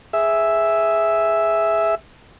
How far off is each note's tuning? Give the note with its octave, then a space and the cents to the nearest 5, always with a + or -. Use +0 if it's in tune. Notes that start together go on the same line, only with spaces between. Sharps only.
G#4 +0 E5 +0